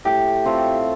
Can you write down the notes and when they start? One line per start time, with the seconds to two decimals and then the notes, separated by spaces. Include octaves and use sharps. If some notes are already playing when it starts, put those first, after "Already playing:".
0.05 A2 G4
0.45 A3 C4 F4